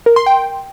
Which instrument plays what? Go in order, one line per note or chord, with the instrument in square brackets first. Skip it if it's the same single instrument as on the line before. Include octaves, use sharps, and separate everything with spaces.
[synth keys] A#4
C6
G5